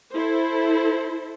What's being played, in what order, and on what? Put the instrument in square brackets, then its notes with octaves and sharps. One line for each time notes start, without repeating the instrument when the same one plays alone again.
[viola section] E4 A4 C5